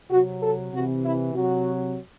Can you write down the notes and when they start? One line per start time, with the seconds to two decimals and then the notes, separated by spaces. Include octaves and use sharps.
0.10 C3 F#3 F#4
0.42 A4
0.73 C3 E3 F#4
1.04 E4
1.34 C3 F#3 F#4